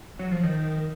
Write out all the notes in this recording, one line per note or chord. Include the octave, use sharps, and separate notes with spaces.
F#3
F3
D#3